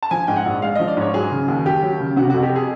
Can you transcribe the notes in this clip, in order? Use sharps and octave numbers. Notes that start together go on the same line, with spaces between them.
A5
F3 G#5
G#2 G5
F#5
A#1
G#3 F5
F3 D#5
D5
G#2 C#5
F#3 G#4
C#3
D#2
D#2 G4
F#3
C#3
C3 F#4
F2 F#4
G4
G#4